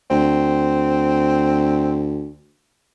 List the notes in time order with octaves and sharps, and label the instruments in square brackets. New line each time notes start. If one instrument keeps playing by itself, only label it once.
[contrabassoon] D2 [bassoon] C4